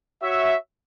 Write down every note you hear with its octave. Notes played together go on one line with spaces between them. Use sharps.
F#4 C#5 E5